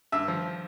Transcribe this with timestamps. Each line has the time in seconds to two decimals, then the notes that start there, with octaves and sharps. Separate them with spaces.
0.12 G2 E5
0.28 F3